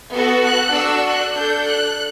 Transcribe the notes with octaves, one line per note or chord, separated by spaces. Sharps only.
B3 F#4 A4
F#6
D4 F#4 A4 E6
F#6
D4 A4 G6
F#6